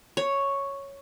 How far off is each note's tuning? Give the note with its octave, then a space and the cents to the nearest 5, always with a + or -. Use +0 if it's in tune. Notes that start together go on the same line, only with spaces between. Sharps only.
C#5 +0